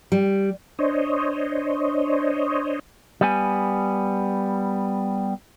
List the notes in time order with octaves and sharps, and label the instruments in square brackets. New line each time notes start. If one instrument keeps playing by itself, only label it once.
[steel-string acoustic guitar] G3
[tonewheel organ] D4 C5 C#5 D#5
[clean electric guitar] G3 B3 G#5